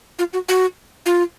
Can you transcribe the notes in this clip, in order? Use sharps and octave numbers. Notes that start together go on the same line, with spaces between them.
F4
F#4
F#4
F4